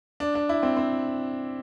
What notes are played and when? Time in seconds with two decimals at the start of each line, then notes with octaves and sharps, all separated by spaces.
0.20 D4
0.35 D4
0.49 E4
0.63 C4
0.77 C4